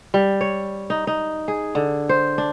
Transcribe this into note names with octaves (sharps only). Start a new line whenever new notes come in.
G3
C#5
D#4
D#4
G#4
D3
C5
D4